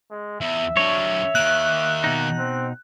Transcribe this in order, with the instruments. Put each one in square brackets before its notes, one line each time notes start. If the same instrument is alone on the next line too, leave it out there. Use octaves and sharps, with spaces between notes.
[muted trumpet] G#3
[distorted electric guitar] E2 [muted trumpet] E5
[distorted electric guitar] F#3 D4 [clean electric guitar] C#5
[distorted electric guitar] D#3 A#3 [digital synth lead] F#6
[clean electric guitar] B2 D#4
[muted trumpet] C4